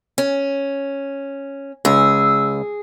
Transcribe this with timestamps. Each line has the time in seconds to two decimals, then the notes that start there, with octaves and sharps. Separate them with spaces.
0.18 C#4
1.85 C#2 G#4 E6